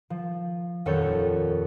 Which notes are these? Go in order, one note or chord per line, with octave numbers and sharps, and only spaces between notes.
F3
D#1 F2 A4 C#5 C#6 G6